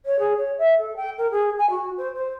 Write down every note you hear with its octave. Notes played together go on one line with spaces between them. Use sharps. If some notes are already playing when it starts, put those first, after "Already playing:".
C#5
G#4
C#5
E5
A4
G5
A#4
G#4
G#5
F#4
C5
C5